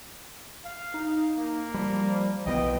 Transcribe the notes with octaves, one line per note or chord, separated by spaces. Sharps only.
F5
D#4
A#3
F3 G3
B1 E3 B3 D#5 G5